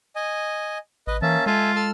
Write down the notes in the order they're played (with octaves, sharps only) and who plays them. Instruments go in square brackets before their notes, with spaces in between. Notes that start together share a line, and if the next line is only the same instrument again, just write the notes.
[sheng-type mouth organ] D#5 G#5
[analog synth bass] A1 [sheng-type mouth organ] B4 D#5
[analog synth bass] E3 [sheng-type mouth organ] A#3 C#4 E5 [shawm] A5
[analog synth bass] G#3 [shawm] F4 [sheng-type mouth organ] A4 E5 G#5
[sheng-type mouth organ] A4 E6 F6